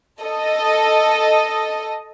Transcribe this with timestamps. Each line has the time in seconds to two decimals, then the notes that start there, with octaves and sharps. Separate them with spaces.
0.22 A4 D#5